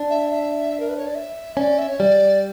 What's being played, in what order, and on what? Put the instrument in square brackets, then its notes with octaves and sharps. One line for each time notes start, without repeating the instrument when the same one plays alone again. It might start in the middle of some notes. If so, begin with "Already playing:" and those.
Already playing: [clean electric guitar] D4
[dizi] E5
E5
A#4
B4
C#5
D5
E5
[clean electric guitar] C#4 [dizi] D5
[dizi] E5
C#5
[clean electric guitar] G3 [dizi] D5